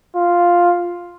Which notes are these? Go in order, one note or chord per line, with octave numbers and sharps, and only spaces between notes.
F4